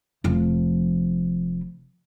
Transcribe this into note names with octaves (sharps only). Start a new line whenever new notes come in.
F1 F3